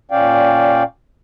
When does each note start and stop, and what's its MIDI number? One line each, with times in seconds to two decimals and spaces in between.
0.11 0.83 46
0.11 0.83 61
0.11 0.83 74
0.11 0.83 77
0.11 0.83 79